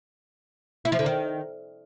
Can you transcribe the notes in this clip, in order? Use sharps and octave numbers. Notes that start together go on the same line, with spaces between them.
E4
F3
D3
D#3